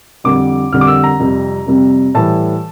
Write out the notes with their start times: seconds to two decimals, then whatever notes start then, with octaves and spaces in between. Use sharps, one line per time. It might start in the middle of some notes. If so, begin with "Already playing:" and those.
0.24 F2 D3 G3 D6
0.73 F2 D3 G3 F6
0.81 D6
0.87 E6
1.04 A#5
1.20 F2 C3 G3
1.66 F2 C3 G3
2.14 A2 E3 G3 A5